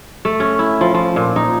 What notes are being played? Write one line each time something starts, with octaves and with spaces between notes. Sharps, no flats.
A3
C#4
E4
F3
F3
A#2
D#4